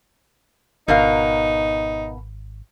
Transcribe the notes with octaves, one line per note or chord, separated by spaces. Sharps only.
G#1 B2 D#4 A#4 F5